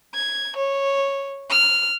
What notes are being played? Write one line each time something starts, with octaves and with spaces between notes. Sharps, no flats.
G#6
C#5
F6